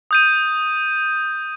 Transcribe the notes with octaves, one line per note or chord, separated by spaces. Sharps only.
D#6 G6 D#7